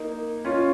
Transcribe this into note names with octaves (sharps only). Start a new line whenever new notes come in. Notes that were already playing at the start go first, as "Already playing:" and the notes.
Already playing: A#3 D#4
C#4 F4